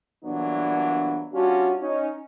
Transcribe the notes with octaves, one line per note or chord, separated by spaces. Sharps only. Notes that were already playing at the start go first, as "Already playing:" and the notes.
G2 A#2 E3 F#3 B3 D4
G3 C#4 D4 F4 F#4
C#4 D#4